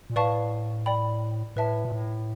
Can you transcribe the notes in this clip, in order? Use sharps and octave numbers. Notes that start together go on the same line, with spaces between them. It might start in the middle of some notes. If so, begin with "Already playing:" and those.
A#2
A2 B4 D5 F5 A5 C#6
D5 G5 B5
A2 B4 E5 A5
A#2
A2